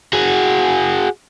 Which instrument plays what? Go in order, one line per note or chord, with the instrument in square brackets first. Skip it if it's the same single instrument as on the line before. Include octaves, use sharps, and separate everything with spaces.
[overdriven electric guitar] F#4 G#4